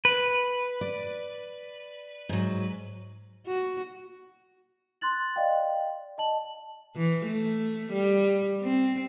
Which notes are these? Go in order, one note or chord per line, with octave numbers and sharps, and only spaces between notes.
B4
D5
G#2 F#3
F#4
C6 F#6 A6 F#7
D5 D#5 F5 G5
D#5 A5 F#7
E3
A3
G3
C4